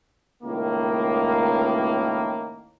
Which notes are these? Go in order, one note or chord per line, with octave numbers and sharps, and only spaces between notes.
C#2 A2 D#3 A#3